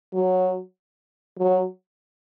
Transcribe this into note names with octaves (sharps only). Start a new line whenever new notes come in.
F#3
F#3